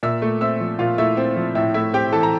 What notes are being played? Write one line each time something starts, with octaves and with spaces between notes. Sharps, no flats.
A#2 E5 E6
A3
C4 E5 E6
F3
A#2 F4 F5
A3 E4 E5
C4
F3
A2 E4 E5
A3 E4 E5
C4 G4 G5
E3 A4 A5
A#5